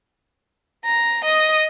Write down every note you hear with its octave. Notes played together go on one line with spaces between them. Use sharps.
A#5
D#5 D#6